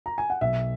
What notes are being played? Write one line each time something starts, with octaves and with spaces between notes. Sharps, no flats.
A#5
G#5
F#5
B1 E5